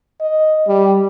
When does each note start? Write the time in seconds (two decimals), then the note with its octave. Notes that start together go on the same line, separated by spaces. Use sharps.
0.21 D#5
0.68 G3